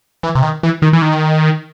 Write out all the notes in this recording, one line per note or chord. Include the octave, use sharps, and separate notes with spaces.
E3
C3
D#3
E3
D#3
E3
D#3